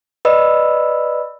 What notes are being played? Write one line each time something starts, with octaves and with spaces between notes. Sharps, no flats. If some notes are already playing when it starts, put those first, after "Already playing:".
B4 D5 D#5 B5 E6